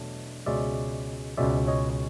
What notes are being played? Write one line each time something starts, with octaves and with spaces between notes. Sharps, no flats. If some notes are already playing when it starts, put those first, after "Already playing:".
Already playing: E2 B2 F#3 A3 D4
C#2 B2 G#3 C#4 D5 E5
C#2 B2 G#3 C#4 D5 E5
C#5 D#5